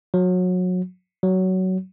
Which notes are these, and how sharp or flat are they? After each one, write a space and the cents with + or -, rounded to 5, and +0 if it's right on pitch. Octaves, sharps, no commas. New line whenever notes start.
F#3 -25
F#3 +15